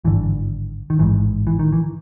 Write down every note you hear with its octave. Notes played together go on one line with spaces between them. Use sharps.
G#1 G2 D3 E3
D#3
A1 G#2 E3
E3
D#3
E3